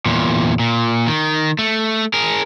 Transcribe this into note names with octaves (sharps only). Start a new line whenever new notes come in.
E2 A#2
A#2
D#3
A3
G#4 A#4